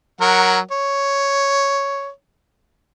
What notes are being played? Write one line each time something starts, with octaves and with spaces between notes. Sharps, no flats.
F#3 A#4 F#5
C#5